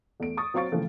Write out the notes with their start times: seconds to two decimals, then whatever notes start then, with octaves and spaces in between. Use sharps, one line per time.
0.20 E2 A3 D7
0.37 C#6 D#6 A6
0.54 F#3 C4 F5 C#6 A6 D7
0.72 A2 C#3 E3 F3 A4